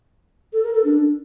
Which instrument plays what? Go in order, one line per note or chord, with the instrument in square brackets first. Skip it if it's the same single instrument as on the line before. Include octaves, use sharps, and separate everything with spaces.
[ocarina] A4
A#4
A4
D4